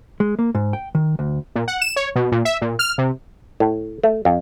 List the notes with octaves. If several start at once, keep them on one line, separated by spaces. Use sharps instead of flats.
G#3
A#3
G#2
G5
D#3
D2
A#2
F#5
E7
C#5
B2
A#2
E5
A#2
F6
C3
A2
A3
F2